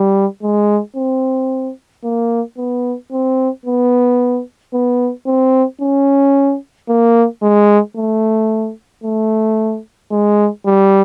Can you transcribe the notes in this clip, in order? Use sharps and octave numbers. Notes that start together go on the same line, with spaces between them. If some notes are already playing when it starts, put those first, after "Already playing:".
Already playing: G3
G#3
C4
A#3
B3
C4
B3
B3
C4
C#4
A#3
G#3
A3
A3
G#3
G3